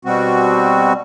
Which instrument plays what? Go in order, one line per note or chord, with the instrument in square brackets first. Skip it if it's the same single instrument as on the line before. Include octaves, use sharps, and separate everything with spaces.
[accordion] B2 G3 C4 F#4